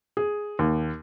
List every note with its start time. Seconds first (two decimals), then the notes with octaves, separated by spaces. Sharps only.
0.17 G#4
0.59 D#2